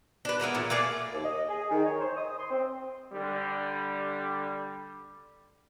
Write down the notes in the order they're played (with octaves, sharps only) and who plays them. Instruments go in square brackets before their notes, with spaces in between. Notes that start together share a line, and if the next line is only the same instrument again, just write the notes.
[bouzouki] D4 B4
G#3 A#3 B3 E4
A#2 E3
A3 A#3 G#4 D5
[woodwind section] D#2
D#5
G#4
D#3
C#5
C5
D#6
C6
C4
[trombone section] D3 G3